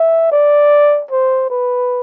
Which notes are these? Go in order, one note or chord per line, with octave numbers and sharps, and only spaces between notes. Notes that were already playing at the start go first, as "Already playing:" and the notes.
Already playing: E5
D5
C5
B4